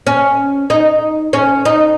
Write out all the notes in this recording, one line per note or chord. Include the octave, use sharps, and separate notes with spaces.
C#4
D#4
C#4
D#4